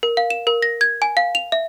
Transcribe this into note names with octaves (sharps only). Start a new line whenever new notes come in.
A#4
F5
E7
A#4
A#6
G#6
G#5
F5
F7
E5